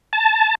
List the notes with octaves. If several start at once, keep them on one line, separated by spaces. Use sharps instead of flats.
A5